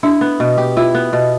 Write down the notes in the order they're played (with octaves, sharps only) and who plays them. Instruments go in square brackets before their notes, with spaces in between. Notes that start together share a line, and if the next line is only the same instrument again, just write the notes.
[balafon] D4 [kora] E4
[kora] B3
B2
G4
[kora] E4 [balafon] F4
[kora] B3
B2